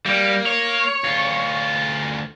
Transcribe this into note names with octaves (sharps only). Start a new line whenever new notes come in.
G3 A#3
C#5
D2 F4